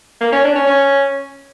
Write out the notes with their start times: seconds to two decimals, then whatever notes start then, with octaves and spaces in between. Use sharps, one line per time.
0.21 A#3
0.33 C#4
0.44 D4
0.56 C#4
0.67 C#4